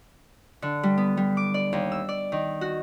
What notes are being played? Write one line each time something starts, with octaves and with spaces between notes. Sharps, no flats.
D3
G3
B3
G3
D6
D5
D#2
E6
D5
D#3
F#4